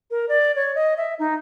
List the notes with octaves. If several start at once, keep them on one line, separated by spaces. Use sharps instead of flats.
A#4
D5
C#5
D#5
E5
D#4